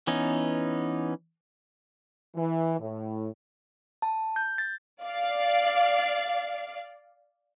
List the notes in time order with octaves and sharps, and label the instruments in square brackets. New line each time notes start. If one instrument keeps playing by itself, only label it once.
[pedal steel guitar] E3 B3 C#4 D#4
[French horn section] E3
A2
[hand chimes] A5
G6
A6
[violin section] D5 F5